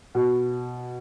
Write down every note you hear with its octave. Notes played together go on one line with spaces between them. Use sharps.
B2